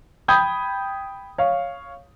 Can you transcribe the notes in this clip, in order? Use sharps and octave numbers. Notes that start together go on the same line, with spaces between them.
G5 B5 D#6 G6 G#6
C#5 F5